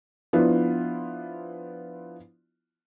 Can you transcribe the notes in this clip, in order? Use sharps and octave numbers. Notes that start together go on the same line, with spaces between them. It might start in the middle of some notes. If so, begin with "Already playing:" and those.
F3 B3 D4 E4 F4